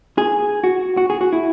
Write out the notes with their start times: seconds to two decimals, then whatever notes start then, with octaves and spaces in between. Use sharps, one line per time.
0.18 G#4
0.64 F#4
0.97 F#4
1.10 G#4
1.21 F#4
1.33 E4